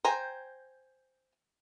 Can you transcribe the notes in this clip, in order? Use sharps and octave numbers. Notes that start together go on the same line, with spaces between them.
C5 G5 G#5 A#5